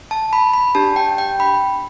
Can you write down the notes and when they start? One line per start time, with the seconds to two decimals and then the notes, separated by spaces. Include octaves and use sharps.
0.11 A5
0.33 B5
0.54 B5
0.75 D4 G4 A5
0.96 G5
1.18 G5
1.40 B5